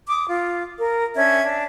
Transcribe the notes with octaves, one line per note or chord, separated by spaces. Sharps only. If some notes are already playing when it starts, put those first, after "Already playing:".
D6 D#6
F4
A#4
C#4 D4 E5 G#6
D4